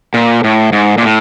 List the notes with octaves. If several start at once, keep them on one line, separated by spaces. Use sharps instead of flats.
A#2
A2
G#2
A#2
A2